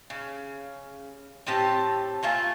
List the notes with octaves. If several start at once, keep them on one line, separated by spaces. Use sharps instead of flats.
C#3
A2 C4 G4 A5
A3 A#3 F4 G#5